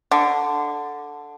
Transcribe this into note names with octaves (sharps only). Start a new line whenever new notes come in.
D3